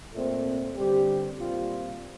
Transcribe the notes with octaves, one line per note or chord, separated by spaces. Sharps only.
A#2 A3 C4
G2 D3 G3 C4 G4
A#2 G3 C4 F4